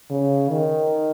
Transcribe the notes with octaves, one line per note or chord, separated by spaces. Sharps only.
C#3
D#3